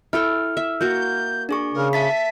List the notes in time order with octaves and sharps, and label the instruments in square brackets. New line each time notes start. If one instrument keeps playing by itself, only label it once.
[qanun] E4 A4 G5 [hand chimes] F6
[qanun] E5
[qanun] A#3 F#4 [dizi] G6
[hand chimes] D4 G#4 C#6
[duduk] C#3 [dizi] A#4
[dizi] E5 [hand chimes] A5 A6 B6